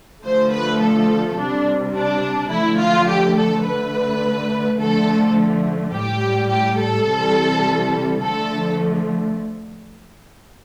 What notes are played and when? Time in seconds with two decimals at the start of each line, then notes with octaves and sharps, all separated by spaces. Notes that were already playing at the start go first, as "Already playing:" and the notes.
0.24 D3 F3 A3 C5
0.53 B4
0.80 A4
1.38 C3 G3 D4
1.95 D4
2.51 D3 F3 A3 E4
2.80 F4
3.08 G4
3.37 A4
3.66 D3 A3 B4
4.79 D3 F3 A3 A4
5.93 A2 G3 G4
6.50 G4
6.78 A4
7.06 C3 E3 G3
8.20 D3 F3 A3 A4